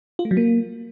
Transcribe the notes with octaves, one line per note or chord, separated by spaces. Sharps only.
F4
A3
F#3
A#3